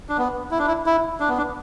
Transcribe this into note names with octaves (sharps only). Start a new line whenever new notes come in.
D4
B3
E4
D4
E4
E4
D4
B3
D4